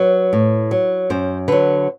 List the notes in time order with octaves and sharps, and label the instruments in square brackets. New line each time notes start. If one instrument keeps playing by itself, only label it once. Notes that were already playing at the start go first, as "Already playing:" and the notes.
Already playing: [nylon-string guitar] F#3 B4
A2
F#3
F#2 C5
D3 F#3 B4